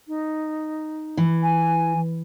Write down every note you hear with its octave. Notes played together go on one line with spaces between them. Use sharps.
D#4
E3
G#5